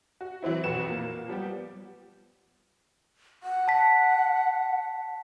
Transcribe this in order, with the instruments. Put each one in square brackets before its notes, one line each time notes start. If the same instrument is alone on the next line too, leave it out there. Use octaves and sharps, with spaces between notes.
[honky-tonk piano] F#4
E3 F#3 C4 E4
F2 B2 F#4 B4 C#7 E7
A#2 A#3
F3 G3 B3 G4
[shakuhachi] F#5
[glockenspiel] A5 B6